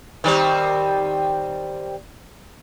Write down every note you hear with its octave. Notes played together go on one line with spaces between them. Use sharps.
D#3 G3 C4